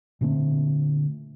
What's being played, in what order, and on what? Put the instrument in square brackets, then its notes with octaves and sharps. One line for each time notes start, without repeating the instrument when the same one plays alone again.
[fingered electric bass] A#2 D3 A3 C4